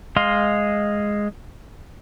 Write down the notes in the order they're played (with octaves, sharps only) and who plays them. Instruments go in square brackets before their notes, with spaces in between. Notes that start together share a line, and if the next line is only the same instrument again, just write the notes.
[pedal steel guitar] G#3 D#5 F5 C6